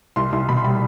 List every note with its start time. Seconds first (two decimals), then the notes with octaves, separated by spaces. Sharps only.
0.16 C2 C6
0.32 C2 C6
0.49 B2 B5
0.57 C6
0.64 G3 B5